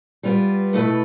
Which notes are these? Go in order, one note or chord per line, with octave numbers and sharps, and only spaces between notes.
G3 B3 F4 B4
B2 A3 E4 B4